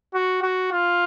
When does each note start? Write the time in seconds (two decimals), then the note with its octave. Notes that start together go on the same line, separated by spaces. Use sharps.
0.14 F#4
0.43 F#4
0.72 F4